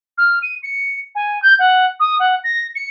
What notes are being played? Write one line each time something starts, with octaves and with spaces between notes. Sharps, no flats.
F6
D#7
C#7
G#5
G6
F#5
D#6
F#5
A#6
C#7